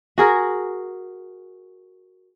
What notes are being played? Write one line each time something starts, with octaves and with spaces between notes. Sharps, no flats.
F#4 G#4 A#4